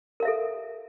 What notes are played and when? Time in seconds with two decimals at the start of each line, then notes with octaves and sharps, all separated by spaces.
0.20 A#4
0.23 F5
0.25 E5
0.28 A4